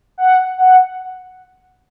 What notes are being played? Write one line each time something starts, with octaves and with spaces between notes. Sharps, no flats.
F#5
F#5